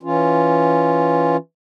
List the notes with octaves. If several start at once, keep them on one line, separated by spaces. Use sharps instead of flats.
E3 C#4 F4